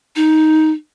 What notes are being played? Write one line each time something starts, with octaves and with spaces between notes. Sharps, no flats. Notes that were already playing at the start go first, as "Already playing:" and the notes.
D#4